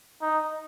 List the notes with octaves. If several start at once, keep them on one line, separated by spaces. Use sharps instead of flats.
D#4